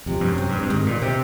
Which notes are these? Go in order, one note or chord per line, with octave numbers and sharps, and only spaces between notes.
F2 C3
G2
F#2
C4
G2
G2
G#2 D#3
A#2
C3 C4